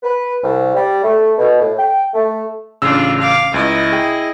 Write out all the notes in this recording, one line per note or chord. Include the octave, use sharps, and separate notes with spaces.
B4
C2
G3
A3
B2
A2
G5
A3
A1 C#3 D4 F4 E6
F5 D6
C#2 E4 D#5
G#4 G5